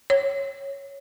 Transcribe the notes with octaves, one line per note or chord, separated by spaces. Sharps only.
C#5